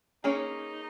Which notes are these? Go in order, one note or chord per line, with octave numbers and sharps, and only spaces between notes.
A#3 C#4 D#4 G#4 C#5